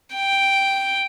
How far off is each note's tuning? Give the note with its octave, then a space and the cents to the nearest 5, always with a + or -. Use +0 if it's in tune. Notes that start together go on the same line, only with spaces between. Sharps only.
G5 +0